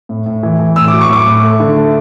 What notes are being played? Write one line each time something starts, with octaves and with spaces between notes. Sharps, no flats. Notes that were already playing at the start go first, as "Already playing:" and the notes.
A2
A2
E3
E3
A2 E6
D6
F#3
C#6
A2 D6
A2
A3
D3
A3